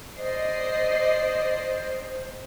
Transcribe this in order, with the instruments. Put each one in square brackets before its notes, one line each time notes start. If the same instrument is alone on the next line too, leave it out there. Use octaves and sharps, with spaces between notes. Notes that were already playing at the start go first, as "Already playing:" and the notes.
[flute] C5 [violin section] D5 D#5 C7